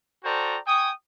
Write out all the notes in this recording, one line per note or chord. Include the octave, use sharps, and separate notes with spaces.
F#4 A4 C5 D5 G5 A#5
G5 G#5 C#6 D#6